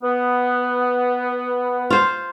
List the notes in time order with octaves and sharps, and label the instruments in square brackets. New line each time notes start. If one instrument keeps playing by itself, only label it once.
[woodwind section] B3
[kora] F4 C5